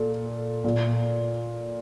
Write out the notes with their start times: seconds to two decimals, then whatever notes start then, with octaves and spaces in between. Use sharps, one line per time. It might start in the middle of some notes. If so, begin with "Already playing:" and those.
Already playing: A#2 A4
0.64 A#2